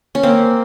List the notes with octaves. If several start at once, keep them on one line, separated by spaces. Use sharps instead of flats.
C#4
A#3 C4